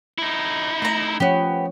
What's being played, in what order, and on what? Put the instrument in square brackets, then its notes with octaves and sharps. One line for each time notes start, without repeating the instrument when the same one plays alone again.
[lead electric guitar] D#4 E4
[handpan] A3 [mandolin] E5 A#5
[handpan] F3 C#4 C#5 [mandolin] B3 G4